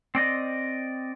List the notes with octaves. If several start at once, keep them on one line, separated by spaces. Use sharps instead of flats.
C4 D5 D#5